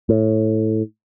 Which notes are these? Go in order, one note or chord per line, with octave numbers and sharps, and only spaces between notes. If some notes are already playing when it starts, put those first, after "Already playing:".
A2